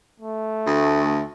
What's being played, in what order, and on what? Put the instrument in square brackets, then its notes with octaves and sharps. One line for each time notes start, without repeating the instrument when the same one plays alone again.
[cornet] A3
[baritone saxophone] D2